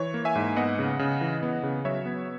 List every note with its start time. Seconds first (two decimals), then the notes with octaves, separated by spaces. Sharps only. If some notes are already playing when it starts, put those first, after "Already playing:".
Already playing: E3 C#5
0.14 A#3
0.25 E5 G#5
0.35 G#2
0.56 B3 D#5 F#5
0.79 C#3
0.99 C#3
1.21 E3
1.43 B3
1.63 C#3
1.85 F#3 C#5 E5
2.06 B3